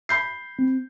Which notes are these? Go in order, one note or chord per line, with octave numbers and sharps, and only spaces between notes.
B5 G6 C7
C4